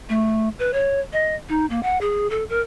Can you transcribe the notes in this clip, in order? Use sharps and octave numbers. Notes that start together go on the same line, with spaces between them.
A3
B4
C#5
D#5
D#4
A#3
F#5
G#4
A4
A#4